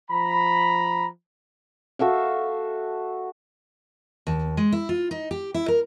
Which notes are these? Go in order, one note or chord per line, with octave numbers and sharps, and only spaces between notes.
F3 A#5 B5
F#4 A4 E5 F5
D#2
G#3
E4
F4
D#4
G4
E4
A#4